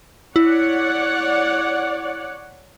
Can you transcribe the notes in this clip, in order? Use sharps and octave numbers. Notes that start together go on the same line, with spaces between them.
E4 C#5 D5 F#5